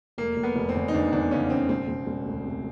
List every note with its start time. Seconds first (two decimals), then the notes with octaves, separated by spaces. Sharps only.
0.18 F1 A#3
0.37 F1
0.43 B3
0.56 F1
0.69 C4
0.75 E2
0.88 D#4
0.94 E2 D4
1.12 E2 D4
1.31 C#3 C#4
1.50 C#3 C4
1.69 E1 C4
1.88 E1
2.07 E1
2.25 D2
2.45 C3